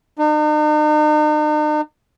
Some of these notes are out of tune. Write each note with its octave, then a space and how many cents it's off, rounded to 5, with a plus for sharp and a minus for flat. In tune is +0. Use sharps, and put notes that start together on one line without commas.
D#4 -45